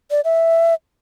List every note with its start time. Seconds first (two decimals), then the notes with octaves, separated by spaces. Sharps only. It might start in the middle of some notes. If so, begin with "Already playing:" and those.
0.11 D5
0.25 E5